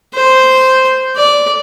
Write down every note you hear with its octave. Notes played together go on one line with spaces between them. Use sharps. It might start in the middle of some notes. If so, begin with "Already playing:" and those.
C5
D5